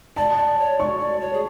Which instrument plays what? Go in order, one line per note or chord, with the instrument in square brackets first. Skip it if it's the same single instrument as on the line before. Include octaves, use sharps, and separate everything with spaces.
[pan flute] D5 [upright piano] A5
[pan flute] D5
C#5
[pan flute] D5 [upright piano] C#6
[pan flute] D5
C#5
G#4